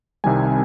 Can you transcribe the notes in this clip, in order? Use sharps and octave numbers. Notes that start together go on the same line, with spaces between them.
C2 C3 D#3 G3 G#5